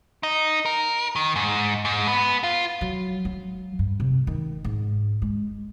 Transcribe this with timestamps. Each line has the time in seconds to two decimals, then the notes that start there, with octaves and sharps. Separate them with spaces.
0.23 D#4
0.66 A#4
1.16 D#3
1.36 G#2
1.85 G#2
2.07 B3
2.43 F4
2.81 F#3
3.25 F#3
3.79 G2
4.00 C3
4.27 D#3
4.64 G#2
5.22 G#3